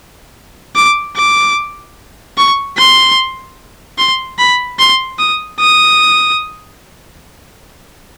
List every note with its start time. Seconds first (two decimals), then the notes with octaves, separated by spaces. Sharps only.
0.76 D6
1.16 D6
2.38 C#6
2.78 C6
3.98 C6
4.38 B5
4.79 C6
5.19 D#6
5.60 D#6